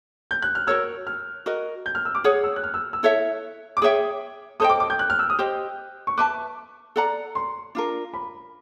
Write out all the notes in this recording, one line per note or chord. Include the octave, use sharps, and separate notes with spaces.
G6
F#6
F6
F#4 A#4 C#5 E6
F6
F#4 A#4 D#5
G6
F6
E6
D6
G#4 C#5 F#5 D#6
E6
F#6
F6
E6
E6
E4 A4 C#5 E5
D6
G#4 C#5 E5 G5 D#6
A4 C5 D#5 G5 D#6
D6
D6
G6
F#6
F6
E6
D#6
G4 C5 D#5
C#6
B4 E5 A5 D6
A4 D5 F#5 A#5
C6
D4 F4 A#4
B5